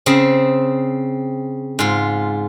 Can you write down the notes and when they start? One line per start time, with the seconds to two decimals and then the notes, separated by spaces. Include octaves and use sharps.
0.06 C#3 C4
1.79 G#2 F4